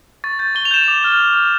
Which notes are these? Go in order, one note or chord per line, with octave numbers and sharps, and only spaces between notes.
C#6 A6
G6 A6
C#6 G7
F7
G6 E7
D6 F7
F6
D6
F6